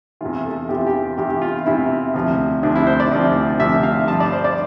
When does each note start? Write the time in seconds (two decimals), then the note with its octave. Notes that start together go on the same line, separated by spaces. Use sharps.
0.21 E2 C3 E3 F4
0.46 A4
0.69 E2 C3 E3 G4
0.78 F4
0.86 G4
1.17 E2 C3 E3 G4
1.30 G4
1.42 F4
1.55 E4
1.66 E2 C3 E3 E4
2.14 D2 C3 F3
2.63 D2 C3 F3 D4
2.76 E4
2.87 C5
3.00 D5
3.12 D2 C3 F3
3.59 D2 C3 F3 E5
3.83 F5
4.07 G2 F3 A5
4.20 D5
4.32 C5
4.44 D5